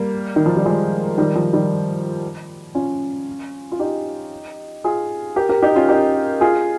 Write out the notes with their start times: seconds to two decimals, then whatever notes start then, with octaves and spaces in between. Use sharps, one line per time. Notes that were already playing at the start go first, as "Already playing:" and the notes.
Already playing: G3 A#3
0.36 D#3
0.46 F3
0.56 G3
0.65 F3 G#3
1.18 D#3 G3
1.35 F3
1.53 D#3 G3
2.75 C#4 F4
3.72 F4
3.79 D#4 G4
4.84 F4 G#4
5.36 G4 A#4
5.49 G4 A#4
5.62 D#4 G4
5.76 C#4 F4
5.89 D#4 G4
6.41 F4 G#4